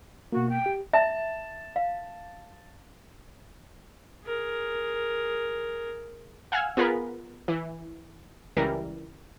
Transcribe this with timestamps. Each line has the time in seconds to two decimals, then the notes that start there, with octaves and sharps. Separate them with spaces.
0.32 B2 A#3 F#4
0.49 G5
0.66 G4
0.93 E5 A5
1.76 F5
4.25 G#4 A#4
6.52 F5 F#5 G#5 E6 F6 G#6
6.77 B3 F4 G#4 A#4 B4
7.48 E3
8.57 C#2 E3 G3 A#4